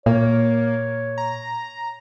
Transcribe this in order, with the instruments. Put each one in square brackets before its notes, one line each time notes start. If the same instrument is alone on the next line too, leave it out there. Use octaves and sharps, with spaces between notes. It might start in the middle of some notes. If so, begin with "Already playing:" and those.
[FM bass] A#2 [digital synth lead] A#3 [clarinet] C#5
[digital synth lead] A#5